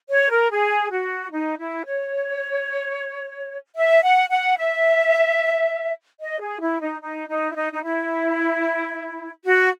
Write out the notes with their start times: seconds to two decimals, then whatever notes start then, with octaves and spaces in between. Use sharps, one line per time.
0.10 C#5
0.29 A#4
0.50 G#4
0.91 F#4
1.31 D#4
1.59 E4
1.86 C#5
3.76 E5
4.02 F#5
4.30 F#5
4.57 E5
6.20 D#5
6.40 G#4
6.60 E4
6.81 D#4
7.01 D#4
7.28 D#4
7.50 E4
7.55 D#4
7.72 D#4
7.83 E4
9.45 F#4